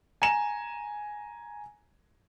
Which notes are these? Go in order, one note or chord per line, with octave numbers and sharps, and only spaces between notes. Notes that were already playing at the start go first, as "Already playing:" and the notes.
G#5 A#5 E7